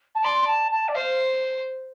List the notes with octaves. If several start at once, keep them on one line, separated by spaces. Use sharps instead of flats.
A5
D5 C6
C6
A5
A5
D5
C5 F5